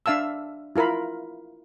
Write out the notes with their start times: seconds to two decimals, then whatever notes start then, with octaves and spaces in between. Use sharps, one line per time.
0.06 D4 E5 F5 A5 E6
0.76 E4 F4 A#4 F5 B5